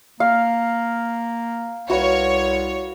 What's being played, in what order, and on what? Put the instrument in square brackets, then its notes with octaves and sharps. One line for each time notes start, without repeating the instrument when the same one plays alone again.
[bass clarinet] A#3 [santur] F5
[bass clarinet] C2 [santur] F#4 B4 F5 [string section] C#5